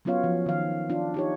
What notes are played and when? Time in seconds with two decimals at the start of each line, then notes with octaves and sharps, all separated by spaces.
0.05 F#3 B3 C#4 F4 C#5 F5
0.24 F3
0.46 D#3 F5
0.90 D4 F4
1.14 D#4 G4 C#5